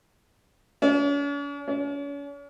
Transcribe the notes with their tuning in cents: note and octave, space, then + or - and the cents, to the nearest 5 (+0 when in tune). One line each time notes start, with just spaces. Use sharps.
C#4 +45
C#4 +40